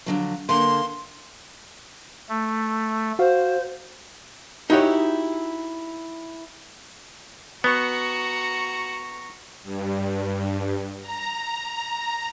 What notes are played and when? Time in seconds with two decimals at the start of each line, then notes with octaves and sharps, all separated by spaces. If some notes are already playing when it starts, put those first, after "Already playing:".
0.06 F2 D3 F#3
0.49 D3 A#3 C6
2.29 A3
3.19 F#4 C5 F5
4.70 D#4 E4 F#4 G4 C#5
7.64 B3 F#4 A#5 C#6
9.63 G2
11.01 A#5